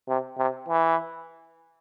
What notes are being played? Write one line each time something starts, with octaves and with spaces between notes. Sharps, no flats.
C3
C3
E3